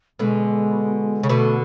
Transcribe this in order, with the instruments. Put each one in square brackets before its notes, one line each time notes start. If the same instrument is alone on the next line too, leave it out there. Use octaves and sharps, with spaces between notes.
[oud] B2 D3 [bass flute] G#3
[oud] C#3
[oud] B2 D3 [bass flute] A3